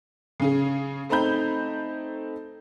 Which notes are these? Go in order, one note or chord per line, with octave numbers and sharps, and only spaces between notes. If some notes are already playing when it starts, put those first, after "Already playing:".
C#3 C#4 G#4
A3 C4 D#4 A#5 B5 G6